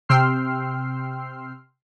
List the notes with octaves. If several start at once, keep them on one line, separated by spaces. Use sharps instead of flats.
C3 G5 C6 E6 F6 C7